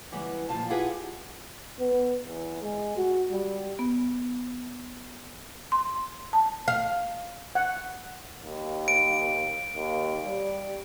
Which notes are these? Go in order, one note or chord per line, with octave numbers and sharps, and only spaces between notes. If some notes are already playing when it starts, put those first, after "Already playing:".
C#3 E3 G3 G#3 B3 E4
A#2 F3 G#3 F4 F5 A5
E4 F4 G4 G#4 B4 F#5
B3
E2
G#3
F#4
G3
B3
C6
A5
F5
F#5
D#2
D7
D#2
G3